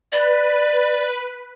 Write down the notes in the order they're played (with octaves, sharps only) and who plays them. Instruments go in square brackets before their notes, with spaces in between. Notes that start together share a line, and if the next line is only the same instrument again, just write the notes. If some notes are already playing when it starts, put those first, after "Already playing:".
[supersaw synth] B4 [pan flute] D5